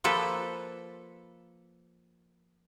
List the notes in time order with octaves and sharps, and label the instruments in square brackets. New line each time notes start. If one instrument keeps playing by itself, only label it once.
[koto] F3 A#3 A4 B4